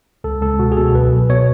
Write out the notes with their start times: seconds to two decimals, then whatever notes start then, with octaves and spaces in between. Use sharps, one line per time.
0.24 C#2 A4
0.42 C#2 A4
0.59 B2 F#4
0.72 G#4
0.77 B2 A4
0.94 B1 B4
1.12 B1
1.30 B2 C#5